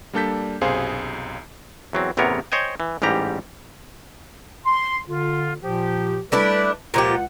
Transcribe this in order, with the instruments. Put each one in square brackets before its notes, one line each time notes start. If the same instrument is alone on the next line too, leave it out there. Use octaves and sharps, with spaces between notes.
[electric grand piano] G3 A#3 D4 A4 G6 B6
B1 F#2 C3 G#4 C5 F5
[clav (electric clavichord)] E2 F#3 C4
A1 E2 C3 B3 A#4 C#5
C5 C#5 D#5 G5 G#5
E3
A1 G#2 G3 G4 A#5
[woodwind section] C6
D3 F4
A#2 F3 G4
[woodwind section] G3 B4 [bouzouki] A3 D4 E4
[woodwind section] C#2 F#5 [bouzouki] A#2 F3 G4